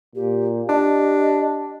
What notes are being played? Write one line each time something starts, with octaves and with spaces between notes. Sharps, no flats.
A#2 G4
D4 G4 D#5